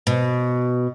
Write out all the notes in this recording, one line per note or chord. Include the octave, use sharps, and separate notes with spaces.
B2